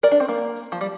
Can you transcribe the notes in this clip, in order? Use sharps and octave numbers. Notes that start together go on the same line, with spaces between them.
A#4 D5
D4
C4
A#3
F3
G3